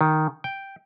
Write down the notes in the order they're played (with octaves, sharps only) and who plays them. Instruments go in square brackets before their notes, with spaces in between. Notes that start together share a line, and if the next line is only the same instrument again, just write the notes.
[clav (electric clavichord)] D#3
G5